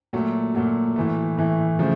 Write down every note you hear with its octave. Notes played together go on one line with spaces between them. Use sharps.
A#2 F#3 A3
A#2 F#3 A3
A2 E3 A3
A2 E3 A3
C#3 F3 A3